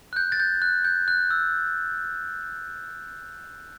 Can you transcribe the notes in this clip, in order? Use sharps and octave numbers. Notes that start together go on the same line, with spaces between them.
F#6
G6
A6
G6
F#6
G6
F#6
E6